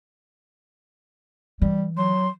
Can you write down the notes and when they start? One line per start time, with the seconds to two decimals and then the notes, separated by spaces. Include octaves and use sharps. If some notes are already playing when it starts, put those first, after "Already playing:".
1.62 E3 G3
1.97 F#3 C6